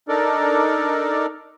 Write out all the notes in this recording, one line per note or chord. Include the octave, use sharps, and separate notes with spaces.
D4 D#4 A4 A#4 D5